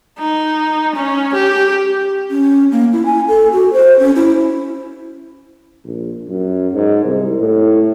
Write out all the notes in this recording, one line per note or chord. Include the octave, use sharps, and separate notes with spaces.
D#4
C#4
G4
C#4
A#3
E4
G#5
A4
F#4
C5
C#4
E4
A#1
F#2
G#2
C2
A2